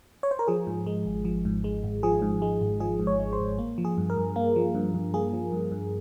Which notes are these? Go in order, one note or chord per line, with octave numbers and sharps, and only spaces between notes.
C#5
C5
A#4
F3 G#4
G#2
G#3
G#1
F3
G#2
G#3
G#1
F3 G#4
G#2
G#3
G#1
F3 G#4
G#2
C#5
G#3
C5
G#1
A#3
F3
G#4
G2
A#4
G2
A#3
F3
G2
G2
A#3 G#4
F3
G2
G2